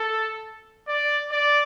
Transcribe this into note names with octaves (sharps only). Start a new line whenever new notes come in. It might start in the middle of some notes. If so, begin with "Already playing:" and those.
Already playing: A4
D5
D5